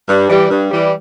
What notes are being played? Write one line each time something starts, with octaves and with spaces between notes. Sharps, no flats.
G2
E3 G3
G2
E3 G3